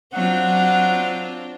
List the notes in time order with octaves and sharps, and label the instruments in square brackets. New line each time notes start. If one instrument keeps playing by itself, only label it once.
[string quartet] F#3 [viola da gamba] C4 D4 F4 [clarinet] F#5